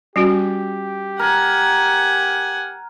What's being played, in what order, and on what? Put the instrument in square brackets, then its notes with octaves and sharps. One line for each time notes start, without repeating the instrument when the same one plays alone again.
[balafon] G3 C#4 F#4 [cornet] G4
[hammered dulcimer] A#4 [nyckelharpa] F#5 G#5